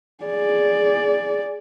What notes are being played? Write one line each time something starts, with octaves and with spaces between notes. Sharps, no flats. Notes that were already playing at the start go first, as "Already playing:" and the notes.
G#4 D5